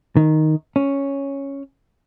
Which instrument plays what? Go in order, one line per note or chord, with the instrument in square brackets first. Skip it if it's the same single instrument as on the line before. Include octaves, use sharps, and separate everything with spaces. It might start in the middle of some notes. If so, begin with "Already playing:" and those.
[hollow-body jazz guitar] D#3
C#4